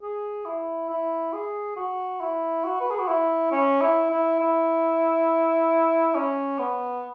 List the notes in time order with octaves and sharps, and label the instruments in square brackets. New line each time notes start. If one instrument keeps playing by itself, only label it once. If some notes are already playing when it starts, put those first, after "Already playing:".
[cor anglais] G#4
E4
E4
G#4
F#4
E4
F#4
B4
G#4
F#4
E4
C#4
E4
E4
E4
C#4
B3